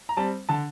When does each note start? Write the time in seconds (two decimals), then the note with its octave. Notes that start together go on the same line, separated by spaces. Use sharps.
0.09 A#5
0.17 G3 C4 A5
0.49 D3 A5